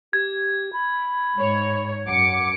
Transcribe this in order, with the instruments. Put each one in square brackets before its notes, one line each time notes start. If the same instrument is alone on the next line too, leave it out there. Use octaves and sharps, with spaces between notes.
[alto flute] G4 [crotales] G#6
[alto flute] B5
[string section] G#2 C#5
[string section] F#2 D6 C#7 [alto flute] F#5